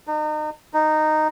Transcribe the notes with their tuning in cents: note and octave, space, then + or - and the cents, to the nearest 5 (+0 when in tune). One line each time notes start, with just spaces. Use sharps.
D#4 -35
D#4 -10